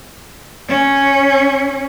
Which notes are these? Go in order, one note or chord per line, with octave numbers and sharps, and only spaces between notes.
C#4